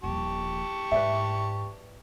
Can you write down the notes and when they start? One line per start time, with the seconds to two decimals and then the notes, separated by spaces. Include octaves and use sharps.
0.03 D#1 F3 G4 A5 C#6
0.92 G#2 B4 D5 E5